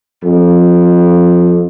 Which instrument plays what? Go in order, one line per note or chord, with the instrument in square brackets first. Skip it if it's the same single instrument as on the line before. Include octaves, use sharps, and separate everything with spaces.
[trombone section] F2